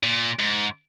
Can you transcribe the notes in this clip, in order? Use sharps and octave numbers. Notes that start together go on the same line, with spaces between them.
A#2
G#2